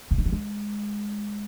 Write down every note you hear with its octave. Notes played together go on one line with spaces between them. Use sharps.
C#3
D#3
F#3
G#3